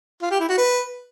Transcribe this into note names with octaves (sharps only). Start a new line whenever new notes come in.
F4
G4
E4
F#4
B4